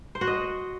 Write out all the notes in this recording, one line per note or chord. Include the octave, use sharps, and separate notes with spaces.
C5
F#4
D#5